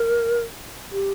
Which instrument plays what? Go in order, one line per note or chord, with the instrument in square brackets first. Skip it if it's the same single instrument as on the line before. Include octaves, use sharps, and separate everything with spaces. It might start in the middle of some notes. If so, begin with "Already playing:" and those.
Already playing: [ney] A#4
G4